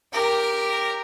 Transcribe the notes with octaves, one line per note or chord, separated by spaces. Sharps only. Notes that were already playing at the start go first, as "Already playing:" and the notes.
G4 A#4